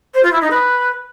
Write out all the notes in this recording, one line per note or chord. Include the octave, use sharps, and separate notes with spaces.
C5
F4
E4
D#4
B4